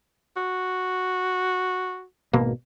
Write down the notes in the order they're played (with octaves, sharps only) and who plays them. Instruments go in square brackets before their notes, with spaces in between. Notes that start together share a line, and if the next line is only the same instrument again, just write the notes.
[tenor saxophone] F#4
[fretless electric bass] G#1 B2 A#3